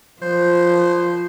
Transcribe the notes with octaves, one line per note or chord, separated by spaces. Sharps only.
F3 C5